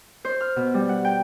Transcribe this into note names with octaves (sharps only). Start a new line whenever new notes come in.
C5
F6
B2
G3
F#5
G5